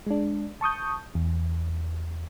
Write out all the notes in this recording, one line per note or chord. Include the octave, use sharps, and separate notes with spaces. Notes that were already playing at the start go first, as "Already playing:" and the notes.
G#3 D4
A5 C#6 D#6 G6
E2